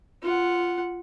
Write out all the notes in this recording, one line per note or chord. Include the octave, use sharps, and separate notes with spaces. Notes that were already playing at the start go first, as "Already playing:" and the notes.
F4 F#5